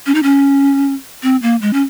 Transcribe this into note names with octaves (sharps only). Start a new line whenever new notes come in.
C#4
D#4
C#4
C4
A#3
G#3
C#4